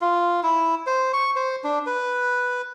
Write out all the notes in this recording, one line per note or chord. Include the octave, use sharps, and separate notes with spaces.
F4
E4
C5
C#6
C5
D4
B4